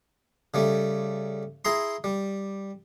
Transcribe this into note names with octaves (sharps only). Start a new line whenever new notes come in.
C#3 G3 A3
E4 G#4 A#5 C6
G3